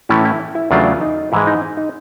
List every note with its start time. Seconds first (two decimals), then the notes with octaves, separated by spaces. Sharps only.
0.09 A2 E3 A3 C#4 E4
0.25 E4
0.55 E4
0.71 E2 C#3 F#3 A3 D4 F4
1.01 D#4
1.32 G#2 E3 G#3 E4
1.47 D#4
1.77 D#4